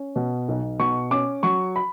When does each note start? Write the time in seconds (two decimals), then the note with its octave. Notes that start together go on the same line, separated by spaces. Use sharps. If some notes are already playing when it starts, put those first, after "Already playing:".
Already playing: C#4
0.16 B2
0.48 B1
0.79 B2 C#6
1.11 C#4 D6
1.43 F#3 C#6
1.76 B5